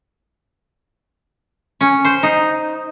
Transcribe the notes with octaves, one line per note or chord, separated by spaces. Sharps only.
C#4
C5
D#4